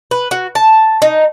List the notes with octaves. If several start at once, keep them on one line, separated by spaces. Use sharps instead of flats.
B4
F#4
A5
D#4